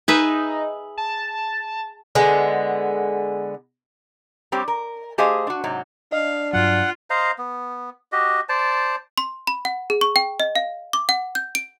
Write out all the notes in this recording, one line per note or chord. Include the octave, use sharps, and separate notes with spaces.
D#4 G#4 B4 E5
A5
D3 G#3 B3
G3 C4 G4 C#5
A#4
A3 G4 G#4 C5 D#5 F5
D4 F#4
G#2 C3 F#3
D4 D#5 F5
G2 F#3 F4 F#5
C5 D#5 F5 A#5
B3
F#4 G4 D#5
C5 D5 A5
C6
B5
F#5
G#4
C#6
G5
D#5
F5
D6
F#5
G6
D7